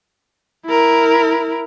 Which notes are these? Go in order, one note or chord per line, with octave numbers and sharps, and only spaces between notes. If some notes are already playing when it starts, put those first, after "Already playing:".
E4 A#4